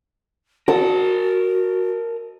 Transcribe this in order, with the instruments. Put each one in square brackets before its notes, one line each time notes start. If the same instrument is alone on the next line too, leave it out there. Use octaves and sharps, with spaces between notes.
[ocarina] F#4 [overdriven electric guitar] A#4 A5 [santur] D#6